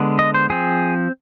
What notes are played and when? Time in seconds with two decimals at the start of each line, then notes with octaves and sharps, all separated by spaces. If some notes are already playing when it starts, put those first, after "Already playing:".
Already playing: D3 G#3 B3
0.19 D#5
0.34 C5
0.50 F3 C4 G#4